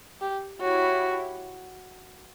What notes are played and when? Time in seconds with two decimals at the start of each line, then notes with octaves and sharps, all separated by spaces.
0.21 G4
0.60 E4 F#4 G4 C#5